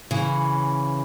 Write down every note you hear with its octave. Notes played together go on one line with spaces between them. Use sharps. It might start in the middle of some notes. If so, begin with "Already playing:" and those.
C#3 E3